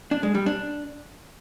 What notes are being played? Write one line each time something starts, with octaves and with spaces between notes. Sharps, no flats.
D4
G#3
G3
D4